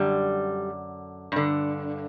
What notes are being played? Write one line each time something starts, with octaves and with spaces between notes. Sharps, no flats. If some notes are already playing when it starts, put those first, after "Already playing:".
Already playing: F#2 D3 G3
G2 D3